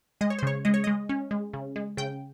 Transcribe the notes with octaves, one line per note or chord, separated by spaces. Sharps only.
G#3 D#5
C#5
C5
C#3 C#5
G#3 D#5
C#5
G#3 D#5
C#4
G#3
C#3
G#3
C#3 G5